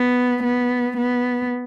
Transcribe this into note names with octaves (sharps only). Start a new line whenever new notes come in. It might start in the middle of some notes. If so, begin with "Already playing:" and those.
Already playing: B3
B3
B3